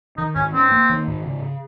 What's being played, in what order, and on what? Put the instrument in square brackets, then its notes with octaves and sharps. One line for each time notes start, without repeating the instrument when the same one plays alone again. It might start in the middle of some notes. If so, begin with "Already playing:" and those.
[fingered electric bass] D#3 [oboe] D#4
[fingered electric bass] G#2 [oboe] C#4
[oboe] C4 [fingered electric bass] C#4
[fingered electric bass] A#3
D#3
G#2
C#3